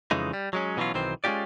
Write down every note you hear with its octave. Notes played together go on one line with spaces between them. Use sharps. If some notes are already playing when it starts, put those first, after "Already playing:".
F2 C#3 E3 G#3 D#4
G3
F#3 G#3 C#4
B2 E3 F#3 C#4 F4
B1 D#3 E3 C4 C5
G#3 C#4 D4 F4 G4 D5